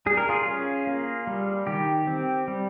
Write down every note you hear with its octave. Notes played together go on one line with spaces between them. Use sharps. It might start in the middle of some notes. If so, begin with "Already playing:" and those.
G3 G#4
A#4
F4 G#4
C#4
A#3
G3
D#3 G4
C4
G3